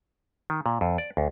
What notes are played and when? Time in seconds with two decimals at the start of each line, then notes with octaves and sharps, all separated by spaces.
0.50 D#3
0.66 A#2
0.81 F2
0.98 D5
1.17 D2